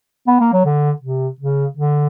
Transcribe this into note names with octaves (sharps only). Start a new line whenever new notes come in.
B3
A#3
F#3
D3
C3
C#3
D3